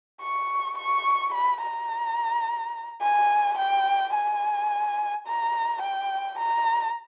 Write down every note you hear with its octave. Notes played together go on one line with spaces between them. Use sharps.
C#6
C#6
B5
A#5
G#5
G5
G#5
A#5
G5
A#5